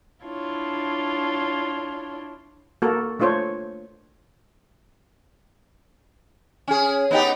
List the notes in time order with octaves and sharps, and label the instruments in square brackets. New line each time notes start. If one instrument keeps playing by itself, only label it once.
[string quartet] D4 E4 F4 C#5
[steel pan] A#3 F#4 A4 A#4
A3 D4 F4 C5 C#5
[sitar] C#4 G#4
B3 D#4 G4